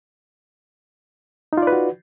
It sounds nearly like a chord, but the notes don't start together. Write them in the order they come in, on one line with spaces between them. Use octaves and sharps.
D#4 F4 D5 B4 F#4